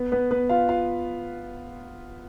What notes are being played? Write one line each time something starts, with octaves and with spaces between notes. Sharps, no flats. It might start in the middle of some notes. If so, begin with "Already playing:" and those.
Already playing: B3 B4
B3 B4
B3 B4
F4 F5
F4 F5